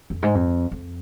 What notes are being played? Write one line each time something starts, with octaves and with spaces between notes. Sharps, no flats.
F2
G#2
F2
F2